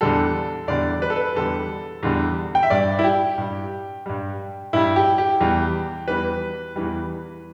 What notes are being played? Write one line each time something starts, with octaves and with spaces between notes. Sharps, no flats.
E2 D3 G3 A4
E2 D3 G3 D5
B4
A4
B4
E2 D3 G3 A4
E2 D3 G3
G5
E5
G2 G3 D5
E4
G4
G2 G3
G2 G3
G2 G3 E4
G4
G4
E2 E3 G3
E2 E3 G3 B4
E2 E3 G3